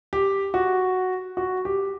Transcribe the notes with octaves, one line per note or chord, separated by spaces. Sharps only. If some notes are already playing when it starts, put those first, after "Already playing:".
G4
F#4
F#4
G4